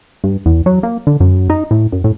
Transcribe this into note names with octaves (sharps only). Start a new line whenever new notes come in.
G2
E2
F#3
A#3
D3
F#2
D#4
A2
F#2
A2